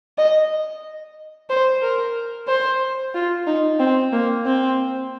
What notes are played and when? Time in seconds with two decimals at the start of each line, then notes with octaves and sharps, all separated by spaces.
0.18 D#5
1.49 C5
1.82 A#4
2.48 C5
3.14 F4
3.47 D#4
3.80 C4
4.13 A#3
4.46 C4